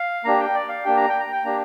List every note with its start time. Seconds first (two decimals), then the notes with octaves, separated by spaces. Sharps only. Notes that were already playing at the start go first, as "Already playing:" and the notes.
Already playing: F5
0.24 A#3 D4 G4 A#5
0.40 G5
0.54 D5
0.69 F5
0.84 A#3 D4 G4 G5
0.97 A#5
1.09 G5
1.20 A#5
1.32 G5
1.44 A#3 D4 G4 A#5